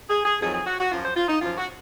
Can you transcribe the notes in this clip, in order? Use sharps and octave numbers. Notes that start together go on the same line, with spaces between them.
G#4
G#4
F2 D#3 F#3 G#4
G#4
F#4
F#4
F#2 F3 F4
C5
F4
D#4
F#2 F3 F4
F#4